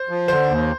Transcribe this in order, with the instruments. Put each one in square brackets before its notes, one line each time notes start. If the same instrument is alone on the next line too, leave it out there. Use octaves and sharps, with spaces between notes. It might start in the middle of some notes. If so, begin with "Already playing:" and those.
Already playing: [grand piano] C5
[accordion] F3
[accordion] D3 [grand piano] C5
[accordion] D#2